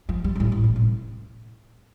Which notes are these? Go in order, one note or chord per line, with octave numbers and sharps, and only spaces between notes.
F3
G3
C3
A2
A2
C3
C3